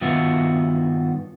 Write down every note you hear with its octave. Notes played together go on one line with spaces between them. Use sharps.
G2 D#3 B3 F4 F#4 E5